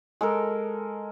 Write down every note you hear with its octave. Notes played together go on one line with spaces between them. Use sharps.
G#3 A4 A#4